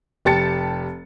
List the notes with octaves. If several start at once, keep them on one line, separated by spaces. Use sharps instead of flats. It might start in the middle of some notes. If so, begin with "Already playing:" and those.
F1 G4 A5 A6 C#7